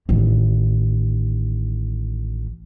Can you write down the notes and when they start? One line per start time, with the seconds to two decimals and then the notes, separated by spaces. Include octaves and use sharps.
0.09 A1 D#3